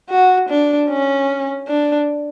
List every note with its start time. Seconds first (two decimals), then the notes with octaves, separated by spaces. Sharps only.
0.10 F#4
0.49 D4
0.89 C#4
1.68 D4